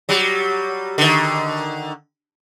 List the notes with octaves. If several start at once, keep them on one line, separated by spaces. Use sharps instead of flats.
F#3 G3
D3 D#3